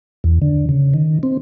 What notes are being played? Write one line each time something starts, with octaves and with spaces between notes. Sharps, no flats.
E2
D3
C#3
D#3
C4